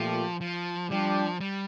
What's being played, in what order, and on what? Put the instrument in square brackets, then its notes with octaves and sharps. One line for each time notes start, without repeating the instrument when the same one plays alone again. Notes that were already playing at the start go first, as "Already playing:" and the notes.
Already playing: [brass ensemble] A#2 A3 G4 [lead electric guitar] F3
[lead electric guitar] F3
[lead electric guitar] F3 [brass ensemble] G3 D4 G4
[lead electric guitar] G3